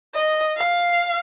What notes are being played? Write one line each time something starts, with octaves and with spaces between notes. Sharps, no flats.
D#5
F5